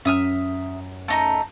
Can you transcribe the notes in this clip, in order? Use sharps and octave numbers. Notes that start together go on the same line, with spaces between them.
F#2 E5 D#6 F6
A3 D#4 A#5